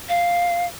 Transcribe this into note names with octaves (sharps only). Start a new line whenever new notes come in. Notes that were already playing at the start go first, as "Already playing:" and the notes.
F5